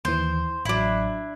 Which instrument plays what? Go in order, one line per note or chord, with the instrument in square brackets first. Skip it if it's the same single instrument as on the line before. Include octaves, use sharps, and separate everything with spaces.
[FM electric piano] D#2 E3 [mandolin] C5
[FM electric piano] A1 F#3 [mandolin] D4 E4